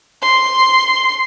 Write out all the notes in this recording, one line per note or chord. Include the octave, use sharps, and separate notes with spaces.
C6